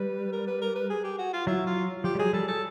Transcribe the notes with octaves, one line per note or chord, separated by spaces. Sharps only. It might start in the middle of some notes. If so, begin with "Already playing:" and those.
Already playing: G3 B4
A#4
B4
A#4
B4
G#4
G4
F#4
F4
F#3 E4
F4
F3 G4
G3
F#3 G#4
G3 A4
A4